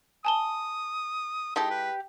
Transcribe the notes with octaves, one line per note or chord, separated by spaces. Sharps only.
G#5 A5 D#6 G7
G#3 D#4 E4 G4 A4
B4